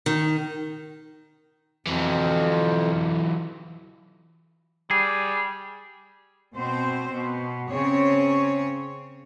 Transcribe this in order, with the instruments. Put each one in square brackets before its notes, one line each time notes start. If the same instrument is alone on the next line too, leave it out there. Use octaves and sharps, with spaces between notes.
[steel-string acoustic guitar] D#3
[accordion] F2 [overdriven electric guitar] E3 F#3
[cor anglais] G3 [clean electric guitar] G#4
[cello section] B2 C4 C5
B2
C#3 C4 C#5